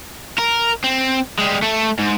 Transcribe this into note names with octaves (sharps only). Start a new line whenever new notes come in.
A#4
C4
G3 G#3
A3
G#2